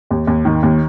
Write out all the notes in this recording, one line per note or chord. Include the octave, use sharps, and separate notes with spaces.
D#2
D#2
D#3
D#2